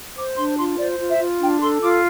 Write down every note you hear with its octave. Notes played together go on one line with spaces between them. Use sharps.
C5 D6
D4 C6
F4 C6
C5 D5
F4
E5
F4
D4 G5
A4 C6
F4 D6